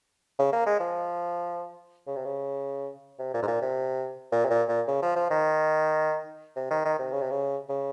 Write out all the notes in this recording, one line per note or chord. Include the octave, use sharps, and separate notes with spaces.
C#3
A#3
G#3
F3
C#3
C3
C#3
C3
A#2
G#2
A#2
C3
A#2
C3
A#2
A#2
C#3
F3
F3
D#3
C3
D#3
D#3
C3
C#3
C3
C#3
C#3